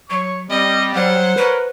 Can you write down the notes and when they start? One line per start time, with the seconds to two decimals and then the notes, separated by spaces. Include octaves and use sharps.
0.10 F#3 C#5 C#6
0.50 G3 C4 D#5
0.94 F#3 C5 F#5
1.37 A#4 B4 C#5 B5